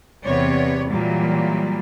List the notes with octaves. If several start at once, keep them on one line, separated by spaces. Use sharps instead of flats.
E2 C3 B3 C#5 D5
A#2 E3 F#3 G3